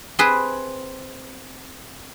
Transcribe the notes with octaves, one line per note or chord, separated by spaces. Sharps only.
C4 G#4 B4